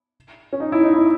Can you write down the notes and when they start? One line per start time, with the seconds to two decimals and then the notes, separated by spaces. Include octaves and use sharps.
0.53 C#4
0.60 D#4
0.72 E4
0.83 D#4
0.94 E4